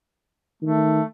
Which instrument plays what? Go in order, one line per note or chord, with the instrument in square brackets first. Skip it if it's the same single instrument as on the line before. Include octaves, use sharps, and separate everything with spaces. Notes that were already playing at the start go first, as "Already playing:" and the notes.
[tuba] D#3 [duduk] A3